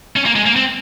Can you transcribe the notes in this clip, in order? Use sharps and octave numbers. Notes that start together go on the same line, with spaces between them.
C#4
A#3
G#3
A#3
C4